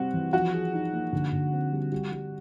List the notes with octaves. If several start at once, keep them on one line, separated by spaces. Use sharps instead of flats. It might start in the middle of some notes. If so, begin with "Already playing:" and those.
Already playing: C3 G3 C4 F#4
E3
F3 F#4
G#4
D#4
A#3
D3
D3
C4
G3
G3
G3